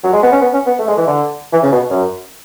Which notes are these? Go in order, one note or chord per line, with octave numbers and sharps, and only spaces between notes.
F#3
G#3
B3
C#4
B3
C#4
B3
A3
G#3
E3
D3
E3
C#3
B2
F#2